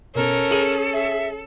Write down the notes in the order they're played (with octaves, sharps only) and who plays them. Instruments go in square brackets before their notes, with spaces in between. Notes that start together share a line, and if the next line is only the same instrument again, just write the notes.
[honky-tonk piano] B2 [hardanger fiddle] C#4 [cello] A4 [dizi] A#4
[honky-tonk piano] G#4 D#7 F#7
[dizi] E5